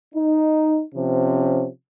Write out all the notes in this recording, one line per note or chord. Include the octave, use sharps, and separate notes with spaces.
D#4
C3 F3 C#4